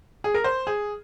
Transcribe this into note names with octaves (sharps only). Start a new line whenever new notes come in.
G#4
A#4
C5
G#4